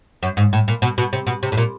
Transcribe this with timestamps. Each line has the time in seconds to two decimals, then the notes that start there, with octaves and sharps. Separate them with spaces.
0.23 F#2
0.37 G#2
0.53 A2
0.68 A#2
0.82 B2
0.98 B2
1.13 C3
1.27 B2
1.43 C3
1.52 A2
1.57 A#2